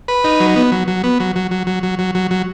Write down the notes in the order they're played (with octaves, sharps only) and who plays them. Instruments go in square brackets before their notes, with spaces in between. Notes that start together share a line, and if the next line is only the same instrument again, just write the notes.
[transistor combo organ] B4
D#4
F#3
B3
F#3
F#3
B3
F#3
F#3
F#3
F#3
F#3
F#3
F#3
F#3